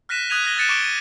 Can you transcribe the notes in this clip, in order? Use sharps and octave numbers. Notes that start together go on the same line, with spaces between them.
F6 F#6 A#6 B6 D#7 E7
D#6 F#6 G#6 D#7 F7
F6 F#6 G#6 A#6 G7
F6 F#6 A6 C#7 D7 E7
C#6 D6 D7 G7
D#7